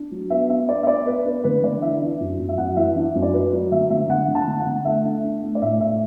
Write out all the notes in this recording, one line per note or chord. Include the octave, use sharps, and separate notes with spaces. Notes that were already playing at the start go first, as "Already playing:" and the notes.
Already playing: D4
F#3
B3 E5
D4 E5
B3 D5
E5
B3 D5
B3 B4
D4 B4
D3 B4
D3 D5
E3 E5
D4
F#2
F#2
E5
F#2 F#5
E3 E5
D4
F#2
D5
F#3 B4
F#3
D3 E5
D3 E5
D3 F#5
D3
A5
D3
F#5
D3
A3 E5
D4
D4
A3
D5
A2 E5
A2 E5